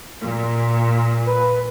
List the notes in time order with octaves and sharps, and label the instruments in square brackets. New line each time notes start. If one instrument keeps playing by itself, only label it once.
[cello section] A#2
[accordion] B4